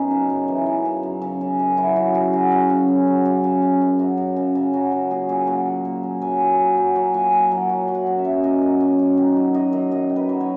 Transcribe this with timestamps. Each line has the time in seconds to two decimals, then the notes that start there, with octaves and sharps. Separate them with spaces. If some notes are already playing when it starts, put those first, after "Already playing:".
Already playing: F#2 B3 C#4 D#4
0.11 C#3
0.30 F#2
0.48 E3
0.66 F#2
0.85 C#3
1.03 F#2
1.22 C#3
1.41 C#3
1.59 F#2
1.77 F#3 E4
1.96 F#2 F#4
2.14 F#2 G#4
2.33 F#3 F#4
2.52 F#2 F#4
2.70 C#3
2.88 F#2
3.07 F#3
3.25 F#2
3.44 C#3
3.62 C#3
3.82 F#2
3.99 F#2 F#4
4.18 F#2
4.36 C#3
4.55 C#3
4.73 F#3 F#4
4.92 F#3
5.11 A#2 G#4
5.29 A#2
5.47 A#2 F#5
5.66 A#2
5.85 A#2
6.03 F#3
6.22 F#3 G#5
6.40 A#2
6.58 F#3
6.77 F#3
6.95 F#3 F#5
7.14 A#2 G#5
7.33 A#2 G#5
7.51 F#3 F#5
7.69 F#3 F#5
7.88 F#3
7.95 F#5
8.07 F#2
8.19 E5
8.25 F#2
8.43 F#2 D#5
8.62 F#3
8.80 F#2
8.99 F#2
9.17 D#3
9.36 F#3
9.54 F#2 D#5
9.73 F#2
9.91 F#2 D#5
10.09 D#3
10.16 B4
10.29 F#3
10.40 C#5